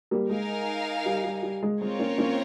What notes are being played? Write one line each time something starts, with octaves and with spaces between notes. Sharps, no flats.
G3 A#3
G#3 D#4 A#4 F5 G#5
G3
G3
G3
G#3
G#3 C4 F4 A#4 C#5
A#3 C#4
A#3 C#4